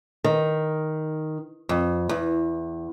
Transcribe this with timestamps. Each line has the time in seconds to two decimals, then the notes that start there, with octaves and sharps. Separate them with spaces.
0.24 D#3
1.69 F2
2.09 E2